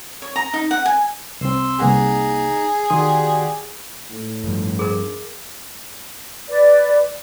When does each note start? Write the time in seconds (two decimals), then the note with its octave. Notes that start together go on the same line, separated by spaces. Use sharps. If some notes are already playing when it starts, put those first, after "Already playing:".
0.22 C#5
0.36 A#5
0.53 D#4
0.71 F#5
0.86 G#5
1.41 C2 C4 C6 E6
1.80 C2 A#3 D#4 G#4 F#5 A#5
2.90 D#3 F#4 G4 D5 C6 D#6
4.10 A2
4.44 G2 F3 G3
4.79 G#4 A#4
6.48 B4 D5